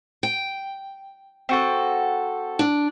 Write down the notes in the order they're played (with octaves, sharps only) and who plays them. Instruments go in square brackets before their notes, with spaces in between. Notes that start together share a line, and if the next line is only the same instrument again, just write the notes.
[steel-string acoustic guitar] G5
[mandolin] C4 F#4 A4
[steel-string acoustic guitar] D4